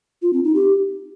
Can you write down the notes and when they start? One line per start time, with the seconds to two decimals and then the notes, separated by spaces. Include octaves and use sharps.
0.22 F4
0.33 C4
0.44 D#4
0.55 G4